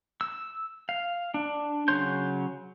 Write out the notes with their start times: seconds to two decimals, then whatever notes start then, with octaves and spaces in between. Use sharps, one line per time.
0.21 E6
0.89 F5
1.34 D4
1.88 C#3 F#3 C#5 C6 G6